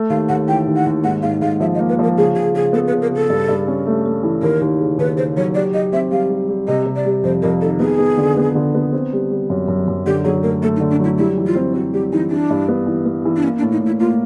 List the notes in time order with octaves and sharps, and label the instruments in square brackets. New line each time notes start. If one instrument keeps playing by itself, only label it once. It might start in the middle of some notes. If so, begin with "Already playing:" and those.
Already playing: [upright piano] A3
[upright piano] D#2 [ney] F5
[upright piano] D#2 [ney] F#5
[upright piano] E3 [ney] G5
[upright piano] D#2
[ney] F#5
[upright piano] D#2
[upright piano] G#2 [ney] F#5
[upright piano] G#2 [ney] F5
[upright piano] G#2 [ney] F5
[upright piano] F3 [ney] E5
[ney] D#5
[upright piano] A#3
[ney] B4
[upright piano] F3 [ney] A#4
[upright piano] C#3 [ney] G#4
[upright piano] C#3 [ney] G#4
[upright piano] C#3 [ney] G#4
[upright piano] B3 [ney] A4
[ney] B4
[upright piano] C#3
[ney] A#4
[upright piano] C#3
[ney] A4
[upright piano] G2
G2
C#4
A3
A3
E3
[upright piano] D#2 [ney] A#4
[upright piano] D#2
C#3
[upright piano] D#2 [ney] B4
[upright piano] C#3 [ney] C5
[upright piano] F#3 [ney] C#5
[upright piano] G4 [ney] D5
[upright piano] G4 [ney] D#5
[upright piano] C4 [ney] E5
[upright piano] G3 [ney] F5
[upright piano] G3
G3
[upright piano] C3 [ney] D#5
[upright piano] C3
[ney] D5
[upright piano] G3
[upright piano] F2 [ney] C5
[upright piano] F2 [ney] A#4
[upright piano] D#3 [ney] A4
[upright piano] B3 [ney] G#4
[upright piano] B3
D3
B3
D3
B3
C4
G3
G3
F#2
F#2
F#2
[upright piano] D3 [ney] G4
[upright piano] F#3 [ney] G#4
[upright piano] A3 [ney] A#4
[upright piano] A3 [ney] A4
[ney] D#4
[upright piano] D3
[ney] D4
[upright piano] F#3 [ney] E4
[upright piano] G3 [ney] E4
[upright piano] E3
[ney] F4
[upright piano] C4
[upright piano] C4 [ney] F#4
[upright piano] G3 [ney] G4
[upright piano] E3 [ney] D#4
[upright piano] E3 [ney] D4
[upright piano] G2
B3
E3
B3
E3
[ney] D4
[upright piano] A#3 [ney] C#4
[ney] D4
[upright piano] A2
[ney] D#4
[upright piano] A2
[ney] E4
[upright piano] A#3 [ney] F4